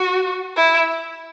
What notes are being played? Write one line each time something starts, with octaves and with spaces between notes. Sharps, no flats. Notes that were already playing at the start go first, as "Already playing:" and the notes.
Already playing: F#4
E4